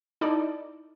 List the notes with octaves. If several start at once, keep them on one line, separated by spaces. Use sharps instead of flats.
D#4 E4 A4 D5